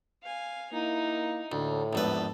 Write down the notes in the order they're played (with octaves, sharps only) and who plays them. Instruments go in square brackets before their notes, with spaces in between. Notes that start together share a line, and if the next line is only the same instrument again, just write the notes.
[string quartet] F5 G#5
[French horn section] A#3 E4 [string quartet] D#4
[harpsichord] D2 [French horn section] A2
[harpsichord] A#1 E2 B4 [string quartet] G#2 A4